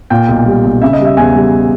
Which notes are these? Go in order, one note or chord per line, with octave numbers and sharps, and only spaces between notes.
A#2 G5
B1
G3
B1
C#3 E5
D#5
G3
E5
E2 G#5
G3